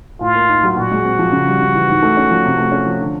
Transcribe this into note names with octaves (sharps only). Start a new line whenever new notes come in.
A2 F4
A#3
D#4
F#3
A#2 F#4
G#3
C4
F3
C#3
G3
C#3
E3
G#2
A3
C#4
F3
C3
A3
C#4
F3
D3